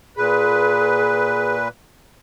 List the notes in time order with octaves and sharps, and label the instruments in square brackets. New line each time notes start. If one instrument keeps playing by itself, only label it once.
[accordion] A#2 B4 [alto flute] G#4